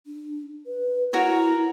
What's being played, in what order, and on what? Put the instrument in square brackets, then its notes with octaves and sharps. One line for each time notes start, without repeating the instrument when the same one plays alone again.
[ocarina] D4
B4
[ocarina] E4 [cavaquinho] F#4 A#4 C#5